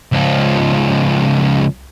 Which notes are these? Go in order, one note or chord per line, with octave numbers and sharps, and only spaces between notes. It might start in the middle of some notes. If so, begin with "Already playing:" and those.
C#2 F3